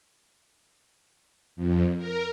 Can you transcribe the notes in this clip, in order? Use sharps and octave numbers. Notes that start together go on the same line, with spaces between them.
F2
A#4